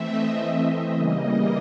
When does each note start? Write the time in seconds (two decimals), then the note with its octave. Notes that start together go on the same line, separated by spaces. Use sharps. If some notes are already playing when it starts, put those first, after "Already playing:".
Already playing: E3 A3 C4 E5
0.10 D#5
0.94 C#3 E3 G3 A#3